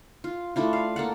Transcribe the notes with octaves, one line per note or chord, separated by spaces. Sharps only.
F4
A3 D4 E4 F4
F5
A#3 A4 F#5